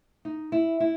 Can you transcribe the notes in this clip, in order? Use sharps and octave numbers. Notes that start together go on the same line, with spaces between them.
D#4
E4
E4